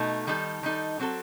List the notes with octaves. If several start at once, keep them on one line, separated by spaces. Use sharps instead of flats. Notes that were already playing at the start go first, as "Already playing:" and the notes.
Already playing: B2 A3 D#4 A4
D#3 G3 D#4 A4
D#3 G3 D#4 A4
F#3 C4 F#4 A4